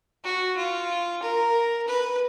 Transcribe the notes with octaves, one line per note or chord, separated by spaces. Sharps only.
F#4
F4
A#4
B4